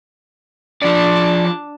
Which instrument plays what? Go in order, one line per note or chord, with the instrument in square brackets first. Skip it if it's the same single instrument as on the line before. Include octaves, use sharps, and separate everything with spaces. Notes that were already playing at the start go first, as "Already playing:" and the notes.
[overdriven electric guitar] F3 D5 [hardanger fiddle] D4 A5